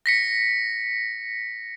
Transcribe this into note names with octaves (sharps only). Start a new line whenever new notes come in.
A#6 B6 C#7